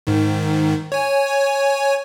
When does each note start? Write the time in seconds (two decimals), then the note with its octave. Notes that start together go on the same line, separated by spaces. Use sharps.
0.07 G#2 D#3
0.92 C#5 G#5